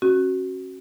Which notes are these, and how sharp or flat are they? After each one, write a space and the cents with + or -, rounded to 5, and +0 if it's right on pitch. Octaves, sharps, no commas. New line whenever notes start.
C#4 -35 F#4 +10